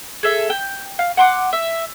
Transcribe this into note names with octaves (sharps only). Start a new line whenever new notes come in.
G#4 A4 E5
G5
F5
F#5 C6 D6
E5